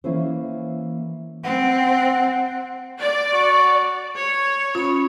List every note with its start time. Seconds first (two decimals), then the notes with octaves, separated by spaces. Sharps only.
0.04 E3 A#3 C#4 E4 C5
1.44 C4 F#5
3.00 D5
3.33 F#4
4.16 C#5
4.75 C#4 F4 B5